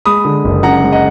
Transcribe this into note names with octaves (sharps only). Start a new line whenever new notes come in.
G#3 B5 D#6
D3
F#1
F#2 F#5 A#5
G#3
D#5 F#5